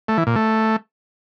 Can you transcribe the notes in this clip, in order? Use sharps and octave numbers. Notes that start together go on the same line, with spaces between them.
A3
E3
A#2
A3